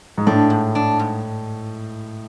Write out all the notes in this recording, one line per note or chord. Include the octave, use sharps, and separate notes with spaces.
G#2
A2 D4
G#2
D4
G#2